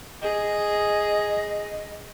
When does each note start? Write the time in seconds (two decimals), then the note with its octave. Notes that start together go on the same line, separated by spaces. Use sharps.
0.21 G#4 D#5